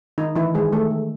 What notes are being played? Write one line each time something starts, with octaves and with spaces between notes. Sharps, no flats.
D#3 D#4
D#3 E3 E4
D#3 G#3 G#4
D#3 A3 A4
D#3